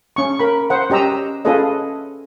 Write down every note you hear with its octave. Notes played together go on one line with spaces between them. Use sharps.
C#4 C#6
A#4 B5
C5 F#5
C#4 G4 D#5 A#5 E6
C#4 F4 G#4 A4 B4 D#5